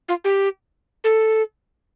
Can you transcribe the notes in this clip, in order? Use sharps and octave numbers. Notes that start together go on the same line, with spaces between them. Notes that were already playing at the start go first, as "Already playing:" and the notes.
F4
G4
A4